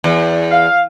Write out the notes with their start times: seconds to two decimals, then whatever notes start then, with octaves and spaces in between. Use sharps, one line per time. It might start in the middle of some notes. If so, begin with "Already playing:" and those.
0.04 E2
0.51 F5